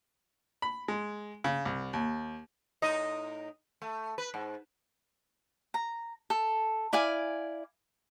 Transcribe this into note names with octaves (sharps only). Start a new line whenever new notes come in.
B5
G#3
C#3
C2
D#2
A2 D#4 D#5
A3
B4
G#2
A#5
A4
E4 D5 F5 G#5